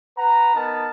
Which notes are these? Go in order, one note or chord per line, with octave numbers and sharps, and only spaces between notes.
B4 F#5 A#5
B3 D#4 A#4 A5